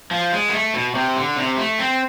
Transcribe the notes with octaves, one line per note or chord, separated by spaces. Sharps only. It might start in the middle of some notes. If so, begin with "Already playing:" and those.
F3
G#3
B3
A3
B2
C3
D3
C3
A3
C4